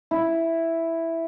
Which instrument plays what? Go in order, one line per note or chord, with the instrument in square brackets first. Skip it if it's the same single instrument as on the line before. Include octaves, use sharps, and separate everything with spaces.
[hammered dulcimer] E4